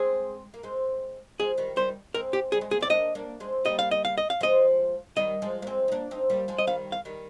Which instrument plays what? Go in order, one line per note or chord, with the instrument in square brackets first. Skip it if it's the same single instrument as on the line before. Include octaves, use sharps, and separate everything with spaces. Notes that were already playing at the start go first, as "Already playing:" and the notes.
Already playing: [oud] G#3 C4 [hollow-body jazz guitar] G#4
[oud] A#3
G#3 C4
[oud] F3 G#3 [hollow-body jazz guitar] G#4
[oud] D#3 G3
[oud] D#3 G3 [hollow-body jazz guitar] C5
[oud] G#3 C4 [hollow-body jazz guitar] A#4
[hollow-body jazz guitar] G4
[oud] G3 [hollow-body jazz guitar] G#4
[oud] G#3
[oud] A#3 [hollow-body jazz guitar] G#4
[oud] C4 [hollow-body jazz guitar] D5
[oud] A#3 D4 [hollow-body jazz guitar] D#5
[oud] A#3 D4
G#3 C4
[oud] G3 A#3 [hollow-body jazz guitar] D#5
[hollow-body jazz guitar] F5
D#5
F5
D#5
F5
[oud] F3 G#3 [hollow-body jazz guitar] D#5
[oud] D#3 G3 [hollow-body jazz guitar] D#5
[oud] F3 G#3
A#3
G#3 C4
D#4
A#3 D4
C4 D#4
G3 A#3
F3 G#3
[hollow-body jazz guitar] D#5
[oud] D#3 G3 [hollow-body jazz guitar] F5
[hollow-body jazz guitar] F5
[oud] D#3 G3